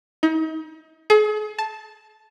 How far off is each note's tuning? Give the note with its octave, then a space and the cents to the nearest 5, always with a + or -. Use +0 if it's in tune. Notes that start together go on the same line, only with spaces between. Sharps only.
D#4 +40
G#4 +40
A5 -10